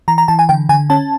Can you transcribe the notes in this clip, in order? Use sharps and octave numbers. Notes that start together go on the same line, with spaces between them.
E3 A#5
A#5
E3 A5
G#5
D3 G5
D3 G#5
C#4 A5